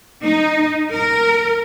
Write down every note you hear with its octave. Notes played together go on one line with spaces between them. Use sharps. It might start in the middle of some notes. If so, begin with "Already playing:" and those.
D#4
A#4